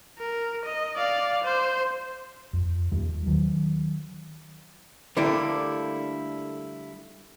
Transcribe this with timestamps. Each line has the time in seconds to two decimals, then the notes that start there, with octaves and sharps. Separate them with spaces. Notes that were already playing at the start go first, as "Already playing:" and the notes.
0.19 A#4
0.65 D#5
0.97 D5 F5
1.43 C5
2.53 F2
2.92 D#2 G3
3.26 D#3 F#3
5.17 D3 G3 A3 A#3 D4 E4